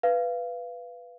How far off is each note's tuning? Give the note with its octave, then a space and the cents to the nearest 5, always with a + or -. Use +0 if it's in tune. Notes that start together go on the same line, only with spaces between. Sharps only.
B4 +0 F5 -20